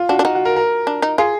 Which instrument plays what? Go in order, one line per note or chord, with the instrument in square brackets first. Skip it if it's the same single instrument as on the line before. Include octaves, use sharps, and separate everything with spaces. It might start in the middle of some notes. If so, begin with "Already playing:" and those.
Already playing: [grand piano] F4
[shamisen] D4 [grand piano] F#4
[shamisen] D4
[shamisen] D#4 [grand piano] F#4
[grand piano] F#4
A#4
A#4
[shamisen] D4
D#4
[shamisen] F4 [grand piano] G#4